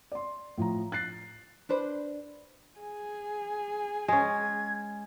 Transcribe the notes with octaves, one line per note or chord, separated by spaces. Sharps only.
D5 C6
A2 F3 A#5
F#6 A6 C7
D4 B4 C5
G#4 G#5
G#3 C#4 G#6